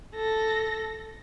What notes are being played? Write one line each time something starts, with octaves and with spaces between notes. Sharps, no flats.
A4 A#6